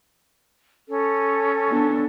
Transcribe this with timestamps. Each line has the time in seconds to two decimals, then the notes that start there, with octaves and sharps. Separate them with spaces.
0.89 C#4 A4
1.69 B3 D4